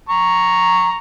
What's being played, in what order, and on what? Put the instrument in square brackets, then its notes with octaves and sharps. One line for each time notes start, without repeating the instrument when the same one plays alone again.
[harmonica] A#5 C#6